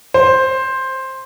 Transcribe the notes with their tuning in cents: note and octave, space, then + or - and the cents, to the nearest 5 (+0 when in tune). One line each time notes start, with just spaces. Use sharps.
C5 +10